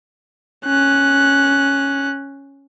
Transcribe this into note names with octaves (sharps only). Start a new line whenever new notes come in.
C#4 F#6